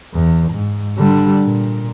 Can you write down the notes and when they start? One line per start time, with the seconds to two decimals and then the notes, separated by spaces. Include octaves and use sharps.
0.14 E2
0.51 G#2
0.98 D3 G3
1.43 A#2